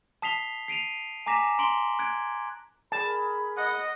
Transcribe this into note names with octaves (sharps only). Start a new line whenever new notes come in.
A5 D#6 B6 C7 F7 G7
C7 D7 D#7 F7
G#5 A#5 D6 A#6 B6 E7
A#5 C6 D7 F#7 G7
F#6 G#6 D7
G#4 A#4 A5 B5
D#5 F#5